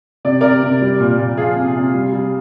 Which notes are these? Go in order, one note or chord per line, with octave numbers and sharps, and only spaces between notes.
C3 D5
C3 A#4 D5
C3
G3
A#2
A#2
F3 F4 G#4
C3
C3
G3
G3